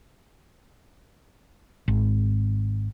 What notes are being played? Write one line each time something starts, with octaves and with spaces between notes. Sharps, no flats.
G#1